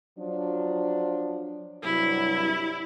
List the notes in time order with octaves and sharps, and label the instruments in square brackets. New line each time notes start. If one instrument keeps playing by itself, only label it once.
[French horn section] F3 F#3 D4
[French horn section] G2 C3 F#3 [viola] E4